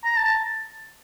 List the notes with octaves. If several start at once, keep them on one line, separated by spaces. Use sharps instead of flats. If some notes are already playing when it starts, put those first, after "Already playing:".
A#5
A5